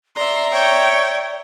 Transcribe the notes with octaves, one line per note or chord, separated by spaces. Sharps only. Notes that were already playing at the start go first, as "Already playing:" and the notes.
D5 E5 A#5 C6
C#5 G5